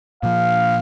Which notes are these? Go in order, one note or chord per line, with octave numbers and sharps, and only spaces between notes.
A#2 F3 F5